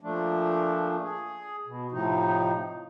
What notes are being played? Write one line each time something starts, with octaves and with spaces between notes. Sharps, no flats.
A#2 F3 A3 D4
G#4
B2
A2 C3 F3 D#4